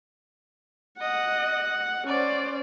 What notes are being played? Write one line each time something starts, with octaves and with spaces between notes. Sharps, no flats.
D#5 F#5
C#4 C5 D5